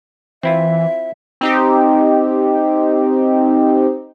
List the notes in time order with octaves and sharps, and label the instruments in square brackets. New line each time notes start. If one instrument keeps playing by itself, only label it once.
[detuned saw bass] E3 [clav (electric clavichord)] C4 E4 F4 [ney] E5
[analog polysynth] C4 D#4 G4